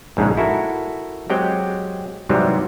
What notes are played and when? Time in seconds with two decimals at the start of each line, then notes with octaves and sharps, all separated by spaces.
0.17 A#1 G#2 C#3 G#3
0.37 E4 F#4 A4 A#4
1.30 F#3 G#3 C4 G4 G5
2.29 G#2 C3 E3 F#3 G3